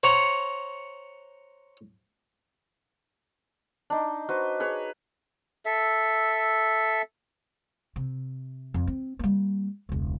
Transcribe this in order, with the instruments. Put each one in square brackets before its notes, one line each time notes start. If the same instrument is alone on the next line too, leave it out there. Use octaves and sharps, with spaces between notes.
[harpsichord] C5 C#5 F#5 A#5 C#6
[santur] D4 D#4
F#4 B4 C5
G#4 B4 C#5
[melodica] A4 E5
[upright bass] C3
F2
C4
G3 A#3
E1 C#2